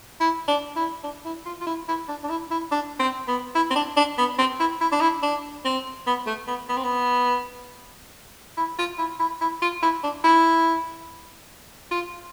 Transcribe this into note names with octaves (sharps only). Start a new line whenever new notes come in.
E4
D4
E4
D4
E4
F4
F4
E4
E4
D4
D4
E4
E4
D4
C4
B3
E4
C4
D4
D4
B3
C4
E4
E4
D4
E4
D4
C4
B3
A3
B3
B3
C4
B3
E4
F4
E4
E4
E4
F4
E4
D4
E4
F4